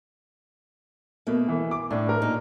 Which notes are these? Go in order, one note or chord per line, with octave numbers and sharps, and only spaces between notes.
B2 A3 A#3
E3
D6
A2 D4
A#4
A#2 D#4